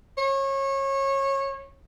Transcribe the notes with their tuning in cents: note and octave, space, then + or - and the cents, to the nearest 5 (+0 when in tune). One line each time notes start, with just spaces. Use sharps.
C#5 -25